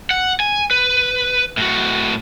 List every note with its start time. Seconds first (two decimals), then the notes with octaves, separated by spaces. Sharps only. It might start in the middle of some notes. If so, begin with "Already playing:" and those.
0.11 F#5
0.40 G#5
0.71 B4
1.57 A2 F#4